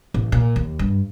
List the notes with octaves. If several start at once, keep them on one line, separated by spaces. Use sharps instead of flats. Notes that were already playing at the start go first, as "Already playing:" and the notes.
A1
A#2
D#2
G2